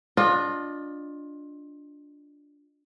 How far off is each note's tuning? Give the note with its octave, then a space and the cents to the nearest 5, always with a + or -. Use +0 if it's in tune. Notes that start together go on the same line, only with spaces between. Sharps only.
D4 -10 F4 +20 D#5 -20